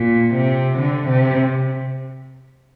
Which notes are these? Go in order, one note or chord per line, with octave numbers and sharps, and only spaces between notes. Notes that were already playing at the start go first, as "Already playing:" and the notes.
Already playing: A#2
C3
D3
C3